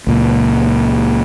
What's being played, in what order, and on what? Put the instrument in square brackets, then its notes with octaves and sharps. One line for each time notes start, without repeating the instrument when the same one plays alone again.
[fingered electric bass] C#2 A#2